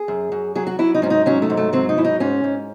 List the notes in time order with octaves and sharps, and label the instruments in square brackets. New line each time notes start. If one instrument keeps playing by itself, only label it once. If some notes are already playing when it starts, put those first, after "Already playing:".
Already playing: [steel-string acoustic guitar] G#4
F#2
F#2
F#3 G#4
F#4
F#3 E4
D#4
G#2 C#4
D#4
F#3 C#4
A3
G#2
A3
F#3 C4
D#4
G#2 E4
D#4
G#2 C#4
G#2